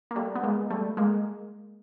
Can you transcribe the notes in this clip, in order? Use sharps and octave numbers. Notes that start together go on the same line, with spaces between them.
A#3
G3 A3
B3
G#3 A#3
G3 A3
G#3 A#3